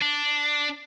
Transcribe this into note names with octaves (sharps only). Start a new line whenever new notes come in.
D4